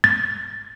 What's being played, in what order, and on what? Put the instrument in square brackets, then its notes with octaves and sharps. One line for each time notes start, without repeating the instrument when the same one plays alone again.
[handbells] A6